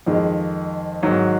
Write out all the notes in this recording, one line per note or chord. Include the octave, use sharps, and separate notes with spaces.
F2 D#3 G#3
G#2 D#3 F#3